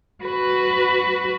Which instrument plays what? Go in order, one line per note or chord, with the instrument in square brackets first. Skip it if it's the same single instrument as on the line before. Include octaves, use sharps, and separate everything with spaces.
[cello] F#4 B4